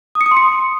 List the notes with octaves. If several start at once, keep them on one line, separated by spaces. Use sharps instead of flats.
D#6
C#7
D#6
C6
C#7